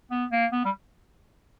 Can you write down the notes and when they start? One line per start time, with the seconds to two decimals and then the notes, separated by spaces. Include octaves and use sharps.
0.11 B3
0.32 A#3
0.52 B3
0.65 G3